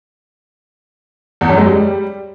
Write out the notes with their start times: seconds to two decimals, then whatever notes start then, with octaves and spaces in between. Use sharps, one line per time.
1.41 E2
1.49 F#2
1.58 G#3
1.66 G3